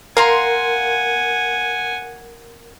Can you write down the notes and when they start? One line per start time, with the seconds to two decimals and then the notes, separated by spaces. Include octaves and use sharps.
0.17 A#4 F5 F#5 G#5 A#5 C6